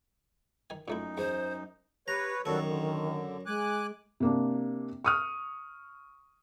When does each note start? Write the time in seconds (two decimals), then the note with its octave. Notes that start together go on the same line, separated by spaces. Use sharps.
0.70 D#3 G#5
0.88 F#2 A#2 A3 D#4 E4
1.18 E2 C5
2.08 G4 B4 C#5 A#5
2.45 F#2 D#3 G3 F#4 A4 C#5
2.66 D3
3.46 G#3 G#5 D6 F#6
4.20 C3 A#3 D4
5.04 C#6 D#6 F6